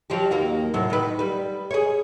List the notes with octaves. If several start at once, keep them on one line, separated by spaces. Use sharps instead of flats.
F3 F#3 G4
D#2 A#3 F#4
A2 C3 F#3
D#3 B4
G3 B4
G#4 C#5